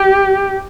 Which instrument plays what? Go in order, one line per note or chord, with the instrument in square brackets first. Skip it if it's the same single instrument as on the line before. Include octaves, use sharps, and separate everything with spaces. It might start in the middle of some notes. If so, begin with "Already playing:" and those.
Already playing: [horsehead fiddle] G4